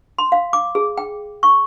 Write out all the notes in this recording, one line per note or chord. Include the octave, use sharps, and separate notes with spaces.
C6
F5
D6
G#4
G5
C#6